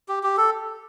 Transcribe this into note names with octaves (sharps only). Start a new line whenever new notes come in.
G4
G4
A4